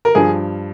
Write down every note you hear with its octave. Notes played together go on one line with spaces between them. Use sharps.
A#4
G2 F3 G#4